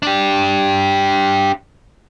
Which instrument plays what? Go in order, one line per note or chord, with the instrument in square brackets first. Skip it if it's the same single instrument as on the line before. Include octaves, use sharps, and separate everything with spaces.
[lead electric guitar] D4 G4